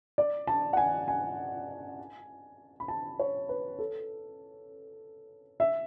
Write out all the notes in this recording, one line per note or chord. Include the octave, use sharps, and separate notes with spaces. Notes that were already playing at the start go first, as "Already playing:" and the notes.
D5
A5
F#5
G#5
G#5
B5
A5
C#5
B4
A4
E5